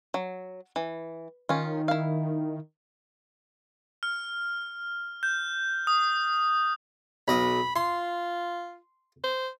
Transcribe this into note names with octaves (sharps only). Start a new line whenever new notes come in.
F#3
E3
D#3 C#4 F4
E4 F5
F6
G6
D#6
B1 D#5 B5
F4 C6
C5